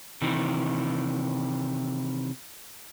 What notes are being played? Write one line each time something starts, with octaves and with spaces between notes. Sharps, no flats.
C3 D#3 E3